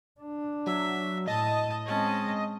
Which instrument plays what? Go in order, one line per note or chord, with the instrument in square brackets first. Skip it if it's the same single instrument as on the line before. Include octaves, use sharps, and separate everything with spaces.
[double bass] D4
[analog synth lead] F#3 [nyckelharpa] E5
[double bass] A2 [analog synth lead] D#5 [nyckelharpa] A5
[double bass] G#3 C4 [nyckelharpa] C#4 A5